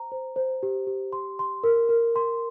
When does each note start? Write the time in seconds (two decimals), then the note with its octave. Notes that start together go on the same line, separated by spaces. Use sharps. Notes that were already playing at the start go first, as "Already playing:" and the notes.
Already playing: C5 A#5
0.12 C5
0.36 C5
0.63 G4
0.87 G4
1.13 C6
1.39 C6
1.64 A#4
1.89 A#4
2.16 C6